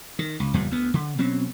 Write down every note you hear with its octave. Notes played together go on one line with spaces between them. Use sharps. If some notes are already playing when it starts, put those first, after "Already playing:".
D#3
C#2
F#1 E2 A#2 G3
D2 B3
D3
B2 F#3 C4 C#4